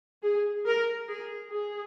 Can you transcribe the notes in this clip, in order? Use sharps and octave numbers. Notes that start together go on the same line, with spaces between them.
G#4
A#4
G#4
G#4